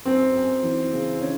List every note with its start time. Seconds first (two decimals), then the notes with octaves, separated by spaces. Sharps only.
0.05 F#2 C4
0.34 F#2
0.63 E3
0.91 C#3
1.21 D#3 C#4